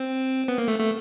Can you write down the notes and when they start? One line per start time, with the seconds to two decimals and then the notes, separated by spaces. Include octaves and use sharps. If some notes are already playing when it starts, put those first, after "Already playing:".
Already playing: C4
0.48 B3
0.58 A#3
0.68 A3
0.79 A3